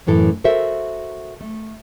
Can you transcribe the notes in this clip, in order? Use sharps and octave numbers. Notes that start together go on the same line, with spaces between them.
F#2 A2 E3 A4
F#4 A4 A#4 C5 E5
A3